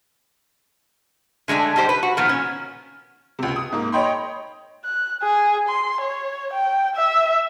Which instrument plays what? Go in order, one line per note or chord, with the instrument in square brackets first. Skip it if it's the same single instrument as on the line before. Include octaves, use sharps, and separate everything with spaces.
[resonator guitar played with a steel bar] D3 G#3 A3 D4 A4
G3 D#4 G4 C5
B4
F#4
A#2 D#3 F3 B3
C#4
[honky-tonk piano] C#2 C3
D#6
G#2 A#3
C#5 D#5 G5 B5 C6
[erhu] F#6
G#4
C6
C#5
G5
E5